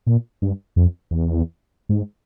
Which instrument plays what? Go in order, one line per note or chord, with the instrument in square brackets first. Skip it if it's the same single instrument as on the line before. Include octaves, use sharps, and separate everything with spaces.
[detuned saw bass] A#2
G2
F2
E2
G#2